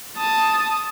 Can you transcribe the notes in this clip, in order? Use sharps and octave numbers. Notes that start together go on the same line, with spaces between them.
A5 D#6